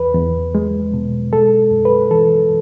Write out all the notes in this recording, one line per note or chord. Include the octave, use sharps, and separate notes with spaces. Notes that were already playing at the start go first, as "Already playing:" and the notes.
Already playing: E2 B4
E2
G#3
B2
G#3 A4
F#2
B4
E3 A4